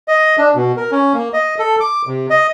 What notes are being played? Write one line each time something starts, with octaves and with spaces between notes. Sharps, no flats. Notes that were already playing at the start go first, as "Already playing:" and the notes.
D#5
D4
B2
A#4
C#4
A#3
D#5
A4
D6
C3
D#5